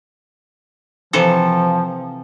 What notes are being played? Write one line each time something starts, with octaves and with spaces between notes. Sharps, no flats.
C3 E3 F3 A4